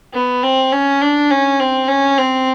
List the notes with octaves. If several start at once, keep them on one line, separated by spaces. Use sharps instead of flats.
B3
C4
C#4
D4
C#4
C4
C#4
C4